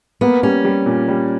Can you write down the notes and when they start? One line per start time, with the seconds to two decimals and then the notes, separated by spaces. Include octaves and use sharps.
0.21 A#3 B3
0.43 G3 C#4
0.65 G3
0.86 A#2
1.08 G3